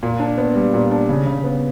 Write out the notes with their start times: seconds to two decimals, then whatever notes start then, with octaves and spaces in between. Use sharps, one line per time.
0.03 A#2
0.20 D4
0.38 B3
0.55 G3
0.74 A#2
0.92 D4
1.09 C#3
1.27 C#3
1.44 B3